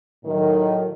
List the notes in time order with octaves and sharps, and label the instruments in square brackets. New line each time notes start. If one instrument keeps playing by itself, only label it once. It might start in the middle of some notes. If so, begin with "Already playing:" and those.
[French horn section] A2 D#3 F#3